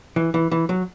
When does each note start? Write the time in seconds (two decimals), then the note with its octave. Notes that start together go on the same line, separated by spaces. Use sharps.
0.16 E3
0.34 E3
0.51 E3
0.69 F#3